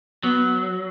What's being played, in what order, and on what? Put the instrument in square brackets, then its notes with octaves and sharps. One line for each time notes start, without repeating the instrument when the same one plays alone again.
[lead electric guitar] F#3 [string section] B3